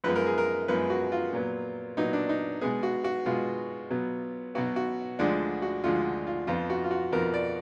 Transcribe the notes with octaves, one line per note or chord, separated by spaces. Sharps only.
F#2 F3 G#3 B3 B4
A#4
G#4
A#4
F#2 F3 G#3 B3 B4
F#4
F4
A#2 F#3 B3
A#2 F#3 B3 D#4
D4
D#4
B2 G#3 B3 G#4
F#4
F#4
B2 G#3 B3 F4
B2 F#3 B3
B2 F#3 B3 F#4
F#4
D2 D3 F3 G#3 D4
F#4
D2 D3 F3 G#3 F4
F4
F2 F3 B3 F4
F#4
F4
F#4
F2 F3 B3 A#4
D5